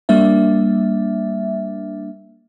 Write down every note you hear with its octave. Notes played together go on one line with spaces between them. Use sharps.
G3 A#3 D4 E5